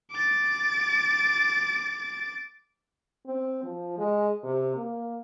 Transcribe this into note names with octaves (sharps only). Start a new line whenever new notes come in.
D6 A6
C4
F3
G#3
C3
A#3